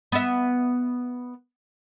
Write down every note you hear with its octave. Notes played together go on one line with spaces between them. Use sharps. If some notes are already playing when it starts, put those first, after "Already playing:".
B3 E5